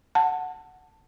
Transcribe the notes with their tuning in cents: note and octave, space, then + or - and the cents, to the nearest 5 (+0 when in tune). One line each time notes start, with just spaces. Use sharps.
F#5 +0 A5 +10